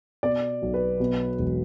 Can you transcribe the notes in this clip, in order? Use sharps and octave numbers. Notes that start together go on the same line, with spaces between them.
B2 D5
B1
B4
B2
E1